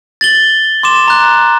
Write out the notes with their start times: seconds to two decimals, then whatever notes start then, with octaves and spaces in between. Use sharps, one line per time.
0.21 A6 F#7 G7
0.83 C6 D6 E7
1.08 A#5 F#6